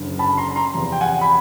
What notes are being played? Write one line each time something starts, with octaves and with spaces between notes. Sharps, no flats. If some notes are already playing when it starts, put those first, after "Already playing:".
Already playing: F#1 F#2 D3
A5 B5
A#5 C6
A#5 C6
E2 C3 F3
G5
F#5 G#5
B5